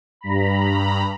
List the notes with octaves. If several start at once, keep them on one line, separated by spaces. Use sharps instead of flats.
G2 A#5 B5